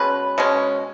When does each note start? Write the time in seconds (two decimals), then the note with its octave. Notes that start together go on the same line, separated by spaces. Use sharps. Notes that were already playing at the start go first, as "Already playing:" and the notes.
Already playing: B2 G#3 C#4 B4
0.38 B2 G#3 C#4